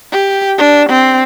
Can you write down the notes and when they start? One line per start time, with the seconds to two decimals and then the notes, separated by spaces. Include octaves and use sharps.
0.12 G4
0.58 D4
0.89 C4